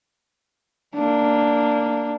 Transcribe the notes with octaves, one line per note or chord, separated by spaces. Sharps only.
A#3 D4